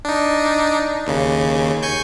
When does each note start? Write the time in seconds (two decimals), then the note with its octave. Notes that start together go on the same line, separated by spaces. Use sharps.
0.05 D4 D#4
1.07 D#2 C#3
1.83 G#5 C#6 G6